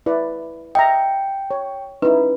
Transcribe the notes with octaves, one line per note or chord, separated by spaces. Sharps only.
E4 B4 D5
D#5 E5 G5 A#5
C#5
C#4 D#4 E4 B4